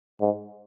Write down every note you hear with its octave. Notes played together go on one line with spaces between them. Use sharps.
G#2